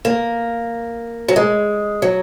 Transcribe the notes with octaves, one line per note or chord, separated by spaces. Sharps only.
A#3
F#3
G#3
F#3